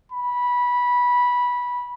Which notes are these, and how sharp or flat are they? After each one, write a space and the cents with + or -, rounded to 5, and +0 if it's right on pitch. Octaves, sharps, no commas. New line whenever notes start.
B5 -15